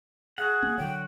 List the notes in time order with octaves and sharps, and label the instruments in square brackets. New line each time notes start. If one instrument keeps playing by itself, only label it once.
[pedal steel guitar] F#4 F#5 [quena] G#4
[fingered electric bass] A#3 C4
[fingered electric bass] D3 F#3 [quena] G5